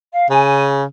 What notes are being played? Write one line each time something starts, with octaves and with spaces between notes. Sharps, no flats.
F5
C#3 G#5